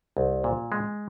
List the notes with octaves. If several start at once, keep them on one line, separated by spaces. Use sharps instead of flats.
C2
A#2
G#3